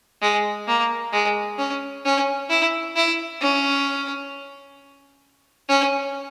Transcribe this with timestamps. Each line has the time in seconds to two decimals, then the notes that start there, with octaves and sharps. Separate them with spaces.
0.22 G#3
0.68 A#3
1.13 G#3
1.59 C#4
2.05 C#4
2.50 E4
2.96 E4
3.41 C#4
5.69 C#4